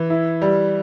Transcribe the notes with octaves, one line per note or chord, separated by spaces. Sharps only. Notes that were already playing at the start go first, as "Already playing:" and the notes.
Already playing: E3
E4
G3